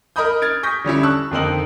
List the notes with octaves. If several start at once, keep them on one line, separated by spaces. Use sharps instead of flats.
A#4 D#5 A#5 B5 D#6 G6
F6 G#6 A6 D7
C#6 D#6 G6 A#6 B6
D3 G3 C#4 E4
A5 C#6 E6 F#6
F2 D3 D#3 C4 D#4 F#7